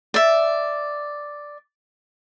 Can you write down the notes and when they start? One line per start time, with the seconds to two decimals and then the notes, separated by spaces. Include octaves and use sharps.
0.14 D5 E5